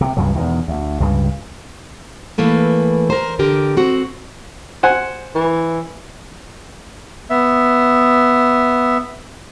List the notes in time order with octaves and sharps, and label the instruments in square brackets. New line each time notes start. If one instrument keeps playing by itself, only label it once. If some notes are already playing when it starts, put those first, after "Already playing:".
[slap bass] C3
C#2 G2 C#3 F#3
E2 B2 D#3
D2
C#2 G2 C#3
[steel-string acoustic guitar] E3 A3 A#3 B4
A#4 C5
D3 G4 A#4
C4 F#4
[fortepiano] C5 F#5 G#5
[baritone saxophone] E3
[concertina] B3 E5